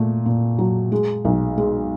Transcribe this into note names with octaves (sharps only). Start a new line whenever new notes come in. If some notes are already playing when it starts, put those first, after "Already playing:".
Already playing: A#2 A3
A#2
F#3
G#3
B1
G#3